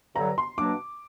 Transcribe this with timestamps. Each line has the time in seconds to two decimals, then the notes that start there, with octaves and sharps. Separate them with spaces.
0.16 G2 D3 F#3 A#5
0.38 C6
0.58 B2 F#3 A#3 D4 D6